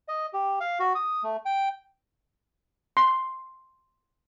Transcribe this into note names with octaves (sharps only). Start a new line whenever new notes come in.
D#5
G4
F5
F#4
D#6
A3
G5
C6